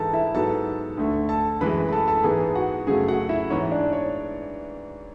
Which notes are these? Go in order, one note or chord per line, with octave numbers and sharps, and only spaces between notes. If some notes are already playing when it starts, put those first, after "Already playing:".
Already playing: G#2 E3 G#3 A4 A5
E4 E5
G#2 F#3 B3 A4 A5
D2 D3 A3
A4 A5
F#2 E3 G#3 B4 B5
B5
A4 A5
A4 A5
G#2 E3 B3 G#4 G#5
F#4 F#5
F#2 C#3 F#3 A3 G#4 G#5
F#4 F#5
E4 E5
G#2 E3 B3 C#4 C#5
D4 D5
C#5